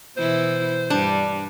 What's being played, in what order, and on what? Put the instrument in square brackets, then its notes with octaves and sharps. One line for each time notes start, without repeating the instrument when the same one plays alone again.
[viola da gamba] B2 E3 E4 [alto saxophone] C5
[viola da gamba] G2 G3 [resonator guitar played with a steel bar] D4